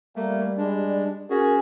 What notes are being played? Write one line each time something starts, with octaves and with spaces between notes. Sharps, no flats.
G3 A3 A#3
G#3 D4
C#4 F#4 G#4 A#4